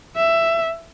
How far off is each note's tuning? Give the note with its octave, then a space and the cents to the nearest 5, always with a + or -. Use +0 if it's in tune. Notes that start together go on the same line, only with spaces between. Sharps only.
E5 +10